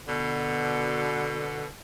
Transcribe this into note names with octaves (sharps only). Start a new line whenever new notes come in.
B2 D3